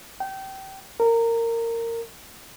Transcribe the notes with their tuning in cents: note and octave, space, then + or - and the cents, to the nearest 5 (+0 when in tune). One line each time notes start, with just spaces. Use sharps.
G5 -25
A#4 -20